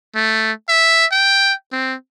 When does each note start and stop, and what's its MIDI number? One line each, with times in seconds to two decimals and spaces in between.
0.15 0.52 57
0.69 1.06 76
1.12 1.53 79
1.72 1.95 60